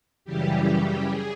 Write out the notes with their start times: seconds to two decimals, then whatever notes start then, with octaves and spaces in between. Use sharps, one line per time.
0.25 F#2 C#3 E3 G3 G4
1.05 G#4